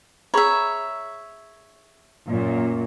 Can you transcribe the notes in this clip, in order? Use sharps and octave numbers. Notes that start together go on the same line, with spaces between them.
G#4 C#5 E5 A#5 B5
F#2 A#2